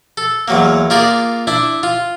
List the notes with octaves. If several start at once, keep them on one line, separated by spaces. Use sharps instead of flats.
A4
E2 F#3 A#3
A#3 F4 G#4 A#4 D5
D4 E4
F4